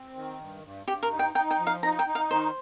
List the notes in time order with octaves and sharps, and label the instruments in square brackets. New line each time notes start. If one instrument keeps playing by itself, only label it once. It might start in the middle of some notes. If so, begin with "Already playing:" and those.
Already playing: [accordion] C4
D#3
G2
G2
[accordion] G2 [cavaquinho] G4
[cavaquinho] A#4
[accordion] D#4
[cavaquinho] G5
[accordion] D#4 [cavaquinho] G5
[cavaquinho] G5
[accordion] F3
[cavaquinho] F5
[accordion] D#4 [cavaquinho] A#5
[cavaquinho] G5
[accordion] D#4
[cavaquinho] F5
[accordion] D#3 [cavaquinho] C5